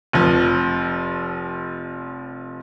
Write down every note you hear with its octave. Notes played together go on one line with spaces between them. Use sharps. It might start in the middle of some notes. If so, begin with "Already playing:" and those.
F1 F3